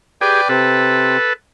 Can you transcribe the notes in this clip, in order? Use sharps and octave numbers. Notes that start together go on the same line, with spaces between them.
G4 G#4 B4 D5 G5
C3 C4 A4 B4